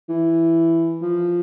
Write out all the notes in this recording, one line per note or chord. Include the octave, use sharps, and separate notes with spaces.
E3
F3